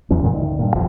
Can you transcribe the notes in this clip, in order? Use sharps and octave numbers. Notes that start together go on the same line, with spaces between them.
E2 E3 F#3 C#4
F#2 A#2 D3 G#3
D2 D#3
G2 A#2
D#1 G#1 F2 F3